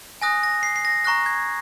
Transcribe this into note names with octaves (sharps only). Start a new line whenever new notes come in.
G#5 D#6 F#6 A#6
A#6
C7
C7
A#6
A#5 C#6 F#6 A#6
G#6